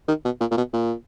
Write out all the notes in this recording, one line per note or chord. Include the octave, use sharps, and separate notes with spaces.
D#3
B2
A#2
A#2
B2
A#2